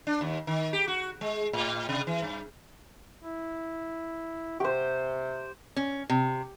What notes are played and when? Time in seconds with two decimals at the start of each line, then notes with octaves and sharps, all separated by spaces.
0.07 D4
0.21 D#2
0.47 D#3
0.73 G4
0.88 F#4
1.21 G#3
1.53 A2
1.89 C3
2.07 E3
2.22 G2
3.22 E4
4.60 C3 G4 C5
5.76 C#4
6.10 C3